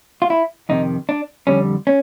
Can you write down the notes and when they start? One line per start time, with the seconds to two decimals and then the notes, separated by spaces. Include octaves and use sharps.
0.22 F4
0.30 E4
0.69 F2 C3 D#3 D#4
1.09 D4
1.47 F2 D3 G3 C#4
1.87 C#4